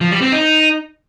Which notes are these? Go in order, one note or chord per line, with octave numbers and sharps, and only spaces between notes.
F3
G3
C4
D#4